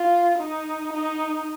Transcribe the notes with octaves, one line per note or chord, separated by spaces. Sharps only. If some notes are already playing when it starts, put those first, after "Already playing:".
Already playing: F4
D#4
D#4